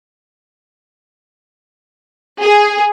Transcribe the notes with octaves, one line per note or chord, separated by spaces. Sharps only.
G#4